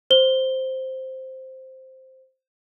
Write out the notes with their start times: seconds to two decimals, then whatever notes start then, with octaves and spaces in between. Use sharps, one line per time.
0.10 C5 G7